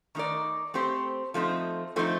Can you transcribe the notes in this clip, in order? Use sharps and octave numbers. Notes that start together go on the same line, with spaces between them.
D#3 A3 D#4 A#4 D5
A3 C4 G4 C5
F3 A3 C4 D#4
F3 A3 C4 D#4